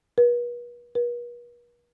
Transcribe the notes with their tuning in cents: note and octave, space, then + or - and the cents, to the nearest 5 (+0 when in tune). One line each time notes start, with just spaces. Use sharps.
B4 -40
B4 -45